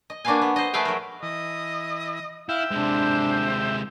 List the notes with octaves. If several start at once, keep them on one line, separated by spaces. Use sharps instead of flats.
D#5
A#3 D4 F#4 B4 F5 G#5
B3
C5 D#5
A3 G#4 B4 E5 F5 G5
F#3 A#4
E3 D#5
E4 E5 F5 G5
C3 G#3 D4 C5